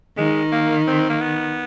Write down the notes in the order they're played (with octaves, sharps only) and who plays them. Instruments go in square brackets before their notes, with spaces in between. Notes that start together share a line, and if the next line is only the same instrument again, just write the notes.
[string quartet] D#3 [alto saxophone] G#3
[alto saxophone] A#3
C4
A#3
B3